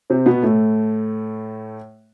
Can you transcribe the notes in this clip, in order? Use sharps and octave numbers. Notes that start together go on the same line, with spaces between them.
C3 C4
B2 B3
A2 A3